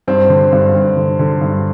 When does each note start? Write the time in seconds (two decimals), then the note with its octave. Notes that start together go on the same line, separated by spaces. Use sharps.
0.08 G2 C4
0.29 D3
0.52 G2
0.74 G2
0.97 D3
1.19 D3
1.41 G2